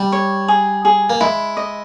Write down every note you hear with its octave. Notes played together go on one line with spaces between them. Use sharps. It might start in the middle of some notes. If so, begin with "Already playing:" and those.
Already playing: G3
C#5
G#4
G#4
A#3
G#3 E4
D#5